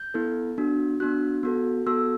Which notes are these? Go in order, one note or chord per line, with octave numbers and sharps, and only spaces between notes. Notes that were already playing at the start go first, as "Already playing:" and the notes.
Already playing: G6
B3 E4 A4
B3 D4 F#4
B3 D4 F#4 F#6
B3 F#4 A4
B3 F#4 A4 E6